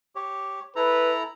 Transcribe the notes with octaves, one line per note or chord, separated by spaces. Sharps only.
G4 C#5
E4 A4 B4 A#5